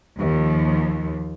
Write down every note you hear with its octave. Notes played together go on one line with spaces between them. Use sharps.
D#2 F3